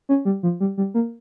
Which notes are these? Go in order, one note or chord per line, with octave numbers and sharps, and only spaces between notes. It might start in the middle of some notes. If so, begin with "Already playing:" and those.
C#4
G3
F3
G3
G3
A#3